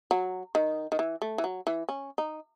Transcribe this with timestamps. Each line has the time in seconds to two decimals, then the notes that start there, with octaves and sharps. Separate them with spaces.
0.11 F#3
0.55 D#3
0.92 D#3
0.99 E3
1.22 A3
1.38 E3
1.44 F#3
1.67 E3
1.89 C#4
2.18 D#4